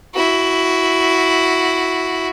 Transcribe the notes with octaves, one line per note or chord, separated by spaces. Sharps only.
E4 F#4